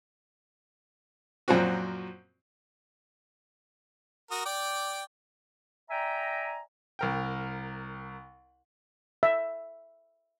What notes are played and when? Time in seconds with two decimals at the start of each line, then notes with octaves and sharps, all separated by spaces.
1.48 F#2 A#2 F3 C4 F#4
4.31 F#4 A#4 D#6
4.46 D5 G5 D6
5.90 D5 E5 G5 G#5 A#5
6.99 C2 A#4 G5
9.23 E5